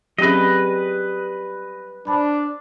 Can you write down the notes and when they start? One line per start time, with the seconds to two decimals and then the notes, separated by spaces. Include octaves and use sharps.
0.19 F#3 G3 C4 C#4 G#4 B4 D#5
2.07 D4 C5 A5 B5